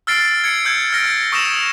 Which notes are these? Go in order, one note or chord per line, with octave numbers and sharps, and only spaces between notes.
E6 F6 A6 C7 D7
G#6 C#7
E6 G6 G#6
F6 A#6 D7
C#6 D#6 E6 A#6 E7